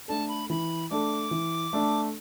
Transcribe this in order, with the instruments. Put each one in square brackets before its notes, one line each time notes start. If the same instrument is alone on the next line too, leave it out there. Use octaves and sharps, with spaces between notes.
[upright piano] A3 D4 A4 [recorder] A5
[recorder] B5
[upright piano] E3 [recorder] B5
[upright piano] A3 D4 A4 [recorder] D6
[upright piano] E3
A3 D4 A4